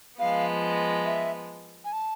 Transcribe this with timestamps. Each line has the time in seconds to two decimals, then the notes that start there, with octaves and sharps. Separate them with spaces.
0.19 F3 G#3 B3 F5
1.05 E5
1.85 G#5
1.93 A5